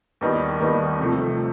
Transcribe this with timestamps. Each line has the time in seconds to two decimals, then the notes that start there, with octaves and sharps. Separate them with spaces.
0.21 D#2 D#3 G3 B3 D#4
0.60 D#2 D#3 G3 B3 D#4
0.99 C3 F3 A3